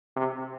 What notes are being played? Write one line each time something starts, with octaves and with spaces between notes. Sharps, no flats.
C3